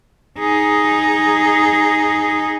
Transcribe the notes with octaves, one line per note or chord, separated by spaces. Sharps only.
D#4 G#4